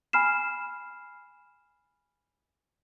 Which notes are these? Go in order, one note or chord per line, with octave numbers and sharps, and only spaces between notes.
G#5 B5 F6 C7 E7